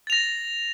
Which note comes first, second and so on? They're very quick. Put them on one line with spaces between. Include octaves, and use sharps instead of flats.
A6 F7 A#6